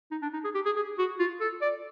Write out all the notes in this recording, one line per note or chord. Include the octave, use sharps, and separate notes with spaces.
D#4
D4
D#4
G#4
G4
G#4
G#4
F#4
F4
A4
D5